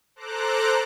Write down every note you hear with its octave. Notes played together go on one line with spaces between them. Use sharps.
A4 C5 A#5 D6 F#6